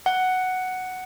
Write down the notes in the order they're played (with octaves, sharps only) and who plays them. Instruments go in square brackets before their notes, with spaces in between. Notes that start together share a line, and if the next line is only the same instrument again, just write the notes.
[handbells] F#5